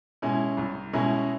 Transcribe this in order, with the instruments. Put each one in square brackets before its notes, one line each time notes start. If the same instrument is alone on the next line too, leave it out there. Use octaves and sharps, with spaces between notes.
[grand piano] B2 G#3 C#4 E4
C2
B2 G#3 C#4 E4